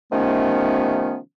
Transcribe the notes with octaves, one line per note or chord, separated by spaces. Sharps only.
C3 D#3 F3 A3 B3 C#4